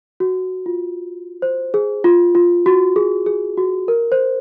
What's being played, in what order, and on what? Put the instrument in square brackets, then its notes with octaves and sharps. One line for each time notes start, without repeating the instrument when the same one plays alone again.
[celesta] F#4
F4
C5
G#4
F4
F4
F#4
G#4
G#4
F#4
A#4
C5